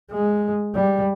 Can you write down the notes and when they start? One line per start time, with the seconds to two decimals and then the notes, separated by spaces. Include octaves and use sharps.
0.12 G#3
0.75 G3